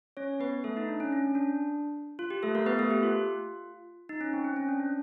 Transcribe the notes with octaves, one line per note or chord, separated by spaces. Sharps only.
C#4 C#5
B3 B4
A3 A4
D#4
D4
C#4
C#4
D4
F4
G4
A3 A4
A#3 A#4
B3 B4
A3 A4
G4
F4
D#4
C#4
C4
C4
C#4
D4
C#4